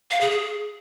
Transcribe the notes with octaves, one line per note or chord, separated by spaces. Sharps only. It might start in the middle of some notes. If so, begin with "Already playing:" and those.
F5
G#4
G#4